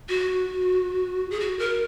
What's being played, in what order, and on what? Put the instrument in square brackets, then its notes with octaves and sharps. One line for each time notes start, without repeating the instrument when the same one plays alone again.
[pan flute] F#4
G#4
F#4
A#4